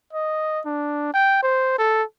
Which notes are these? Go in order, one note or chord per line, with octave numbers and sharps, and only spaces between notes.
D#5
D4
G5
C5
A4